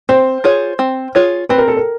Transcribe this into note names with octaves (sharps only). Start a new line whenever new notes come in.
C4 C5
F4 G#4 C#5
C4
F4 G#4 C#5
C4 B4
A#4
A4
A#4